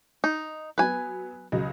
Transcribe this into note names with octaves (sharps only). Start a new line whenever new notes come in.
D#4
F#3 B3 B4 G#5
C#2 F#3 D#5